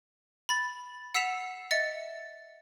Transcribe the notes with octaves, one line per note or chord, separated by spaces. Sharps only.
B5 A6
F#5 E6 B6 C7 E7 F7
D#5 E5 A6 C#7